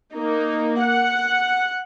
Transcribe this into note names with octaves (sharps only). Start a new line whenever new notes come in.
A#3 D#4
F#5